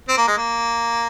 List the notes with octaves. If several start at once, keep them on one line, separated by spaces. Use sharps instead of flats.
C4
A#3
G#3
A#3